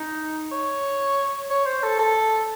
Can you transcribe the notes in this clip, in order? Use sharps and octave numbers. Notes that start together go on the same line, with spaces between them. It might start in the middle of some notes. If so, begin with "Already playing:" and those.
Already playing: D#4
C#5
C#5
C5
A4
A4